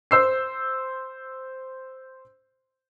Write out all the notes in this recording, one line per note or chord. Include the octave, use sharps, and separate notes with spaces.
C5 E6 C7